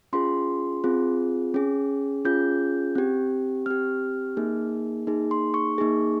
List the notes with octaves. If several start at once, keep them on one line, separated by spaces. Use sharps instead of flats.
C#4 F4 G#4 C6
C4 F4 G#4
C#4 G#4
C#4 F4 G#4 G6
C4 G4
C4 G4 F6
A#3 D#4 G#4
A#3 D#4 G#4
C6
C#6
A#3 D#4 G#4